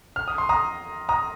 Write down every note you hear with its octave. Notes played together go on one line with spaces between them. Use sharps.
F6
D#6
C6
A#5 D#6
A#5 D#6